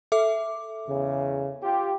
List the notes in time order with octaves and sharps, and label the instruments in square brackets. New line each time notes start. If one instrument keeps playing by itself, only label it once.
[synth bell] A4 E5 D6
[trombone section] E2 C#3
F4 G4